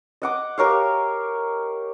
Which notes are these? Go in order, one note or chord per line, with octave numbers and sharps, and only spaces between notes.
D#5 F#5 D6
G4 A#4 C#5 F5